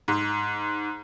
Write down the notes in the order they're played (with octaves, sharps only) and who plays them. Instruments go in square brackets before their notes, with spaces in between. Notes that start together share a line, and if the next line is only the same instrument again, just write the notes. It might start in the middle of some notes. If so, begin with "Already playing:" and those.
[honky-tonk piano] G#2